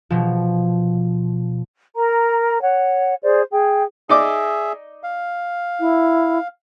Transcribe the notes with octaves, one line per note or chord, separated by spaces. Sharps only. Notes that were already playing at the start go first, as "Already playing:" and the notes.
B2 F3
A#4 A#5
C#5 F#5
G#4 C5 D5
G#4 G5
D#4 G#4 D5 E5 D6
F5
E4